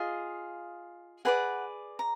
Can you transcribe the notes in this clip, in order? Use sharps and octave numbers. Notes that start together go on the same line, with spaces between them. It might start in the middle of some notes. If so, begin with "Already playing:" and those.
Already playing: F4 G#4 D#5 F5
G#4 B4 D5 F#5
A#5